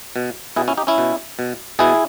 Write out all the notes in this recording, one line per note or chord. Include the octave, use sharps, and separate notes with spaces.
B2
B2 E4 G#4
C#4 E4
D#4 G4
C#4 E4
B2
B2
B2 E4 G#4